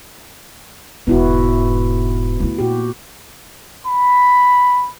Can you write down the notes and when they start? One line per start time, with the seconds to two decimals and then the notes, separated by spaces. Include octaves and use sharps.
1.07 E1 G#2 B3 E4 F#4
2.40 A3 E4
2.59 A#2 F#4 G4
3.87 B5